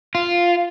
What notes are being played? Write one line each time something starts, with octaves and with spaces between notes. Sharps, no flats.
F4